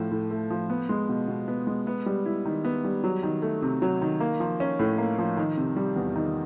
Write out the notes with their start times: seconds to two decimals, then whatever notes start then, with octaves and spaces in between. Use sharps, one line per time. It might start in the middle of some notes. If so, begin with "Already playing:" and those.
Already playing: A2 F3 A3
0.11 A2
0.31 A3
0.50 F3
0.70 B3
0.89 G#3
1.09 B2
1.28 B2
1.48 B3
1.67 G#3
1.87 B3
2.06 G3
2.26 E4
2.45 D#3
2.64 B3
2.84 G3
3.04 F#3
3.23 D#3
3.42 A3
3.62 C3
3.82 F#3
4.02 D#3
4.20 A#3
4.40 F3
4.60 C#4
4.79 A2
4.98 A#3
5.19 F3
5.37 D#3
5.57 C3
5.76 G3
5.96 E2
6.16 D#3